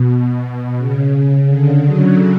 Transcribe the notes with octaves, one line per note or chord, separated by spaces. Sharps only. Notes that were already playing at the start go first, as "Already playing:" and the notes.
Already playing: B2
C#3
D3
F#3